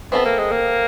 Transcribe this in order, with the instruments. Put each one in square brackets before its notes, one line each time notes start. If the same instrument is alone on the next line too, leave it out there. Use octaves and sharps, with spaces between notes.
[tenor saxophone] B3 [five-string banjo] C4 E4 A4
[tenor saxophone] A#3
G#3
A#3